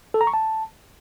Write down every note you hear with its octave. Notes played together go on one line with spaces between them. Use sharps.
A4
A#5
C#6
A5